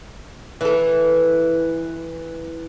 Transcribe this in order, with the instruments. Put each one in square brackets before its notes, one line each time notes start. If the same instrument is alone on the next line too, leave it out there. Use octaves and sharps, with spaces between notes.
[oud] E3 A4